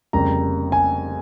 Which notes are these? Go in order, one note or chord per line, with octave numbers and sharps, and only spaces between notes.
F1 F2 C#3 G3 A#3 A#5
G#5